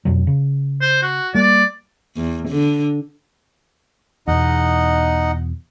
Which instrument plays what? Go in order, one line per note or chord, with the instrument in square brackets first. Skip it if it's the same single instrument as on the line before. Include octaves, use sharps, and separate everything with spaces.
[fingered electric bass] F2 B2 F#3
C#3
[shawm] C5
F#4
[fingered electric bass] G3 A#3 [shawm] D5
[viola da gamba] E2
D3
[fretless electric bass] E2 B2 [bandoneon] D#4 D#5 F#5